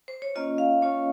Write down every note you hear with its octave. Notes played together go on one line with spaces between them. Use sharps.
C5
C#5
A#3 C#4 F4 D#5
F5
A#3 C#4 F4 C#5